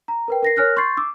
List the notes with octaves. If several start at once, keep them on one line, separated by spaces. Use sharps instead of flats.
A#5
A#4 B4 G5
A#4 A#6 C7
A#4 C#5 G#5 F6 F#6 A#6
C6 C#6 G6 A6 C7
D6 E6